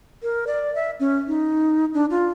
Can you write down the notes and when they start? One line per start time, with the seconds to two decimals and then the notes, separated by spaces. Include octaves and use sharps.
0.23 A#4
0.47 D5
0.75 E5
1.00 C#4
1.27 D#4
1.94 D4
2.10 F4